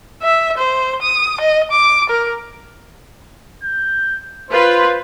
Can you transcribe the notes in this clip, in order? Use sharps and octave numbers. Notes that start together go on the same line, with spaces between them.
E5
C5
D#6
D#5
D6
A#4
G6
F4 B4 C5